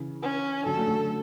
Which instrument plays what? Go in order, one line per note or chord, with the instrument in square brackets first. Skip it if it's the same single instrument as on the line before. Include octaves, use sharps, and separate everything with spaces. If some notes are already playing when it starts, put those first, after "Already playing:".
Already playing: [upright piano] C#3 E3
[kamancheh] C#4
[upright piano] D3 F#3 [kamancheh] A4
[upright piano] F#3 A3
F#3 A3